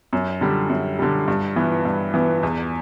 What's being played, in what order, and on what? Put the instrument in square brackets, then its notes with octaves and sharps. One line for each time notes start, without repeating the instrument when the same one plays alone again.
[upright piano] F#2
D3 G3
F#2
D3 G3
G2
E3 B3
G2
E3 B3
E2